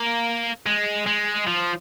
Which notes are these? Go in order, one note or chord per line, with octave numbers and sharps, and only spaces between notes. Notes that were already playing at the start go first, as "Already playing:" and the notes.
Already playing: A#3
G#3
G#3
F3